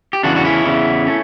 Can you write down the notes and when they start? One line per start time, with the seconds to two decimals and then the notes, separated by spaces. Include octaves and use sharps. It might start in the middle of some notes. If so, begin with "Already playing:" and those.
0.13 G4
0.23 E2 C#3 E3 D4 F#4
0.36 F#4
0.44 C#4 E4
0.65 E2 C#3 E3
1.07 A3 C#4